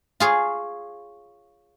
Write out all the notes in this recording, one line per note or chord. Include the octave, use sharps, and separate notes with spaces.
F4 G#4 C#5